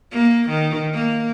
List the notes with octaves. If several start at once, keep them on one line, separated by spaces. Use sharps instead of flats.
A#3
D#3
A#3